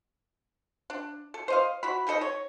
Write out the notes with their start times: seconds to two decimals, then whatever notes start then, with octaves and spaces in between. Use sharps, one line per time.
0.90 D4
1.34 A4
1.48 C5 D#5 F5
1.83 E4 F#4 B5
2.07 G3 D#4 A4 D#5
2.21 C#5